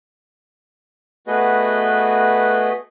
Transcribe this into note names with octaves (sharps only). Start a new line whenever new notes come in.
A3 B3 F#4 G#4 B4 D#5